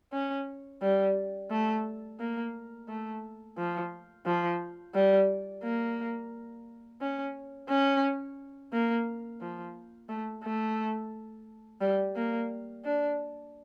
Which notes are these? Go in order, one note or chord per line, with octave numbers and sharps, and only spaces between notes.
C#4
G3
A3
A#3
A3
F3
F3
G3
A#3
C#4
C#4
A#3
F3
A3
A3
G3
A#3
D4